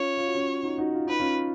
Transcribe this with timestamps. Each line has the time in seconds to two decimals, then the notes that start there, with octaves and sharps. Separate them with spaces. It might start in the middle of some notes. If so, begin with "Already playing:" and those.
Already playing: C#4 F4 C#5
0.17 F4
0.26 F#4
0.35 C#4 F4
0.63 D#4 F#4
0.78 D#4 F#4
0.94 F4
1.07 D#4 B4
1.20 C#4 F4